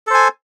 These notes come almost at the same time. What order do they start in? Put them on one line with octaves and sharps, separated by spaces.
A4 C5 G#5